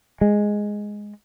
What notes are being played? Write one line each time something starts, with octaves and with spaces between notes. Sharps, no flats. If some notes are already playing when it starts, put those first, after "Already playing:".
G#3